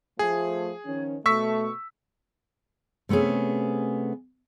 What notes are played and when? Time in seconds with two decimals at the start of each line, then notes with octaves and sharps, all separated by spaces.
0.19 F3 A3 G#4
0.86 D#3 F3 C#4
1.26 B2 A3 C#6 E6 B6
3.09 C3 A3 B3 C#4 G#4